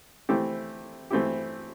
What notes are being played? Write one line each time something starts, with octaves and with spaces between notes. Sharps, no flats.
E3 A3 C4 E4 G4
E3 A3 C4 E4 G4